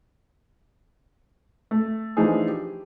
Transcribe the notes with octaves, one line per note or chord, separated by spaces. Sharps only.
A3
E3 F3 A3 D4 D#4 G#4
G4